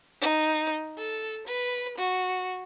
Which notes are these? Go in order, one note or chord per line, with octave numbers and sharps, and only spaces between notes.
D#4
A4
B4
F#4